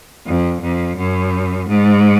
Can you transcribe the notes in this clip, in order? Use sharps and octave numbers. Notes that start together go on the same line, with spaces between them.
F2
F2
F#2
G#2